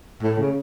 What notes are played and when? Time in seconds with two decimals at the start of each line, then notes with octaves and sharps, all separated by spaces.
0.22 A2
0.39 C#3